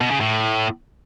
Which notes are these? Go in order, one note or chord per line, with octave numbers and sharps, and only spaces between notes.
B2
C#3
A2